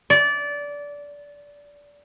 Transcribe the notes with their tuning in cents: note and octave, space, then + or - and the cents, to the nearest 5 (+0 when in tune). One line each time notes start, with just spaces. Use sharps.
D5 -20